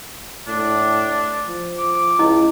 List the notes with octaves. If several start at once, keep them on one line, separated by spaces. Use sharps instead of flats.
A2 D4
F3
D6
C#2 E4 D#5